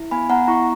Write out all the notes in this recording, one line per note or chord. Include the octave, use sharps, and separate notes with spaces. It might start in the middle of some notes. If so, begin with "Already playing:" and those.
Already playing: E4
B3 G#5 B5
B3 F#5 A#5
E4 A#5 C#6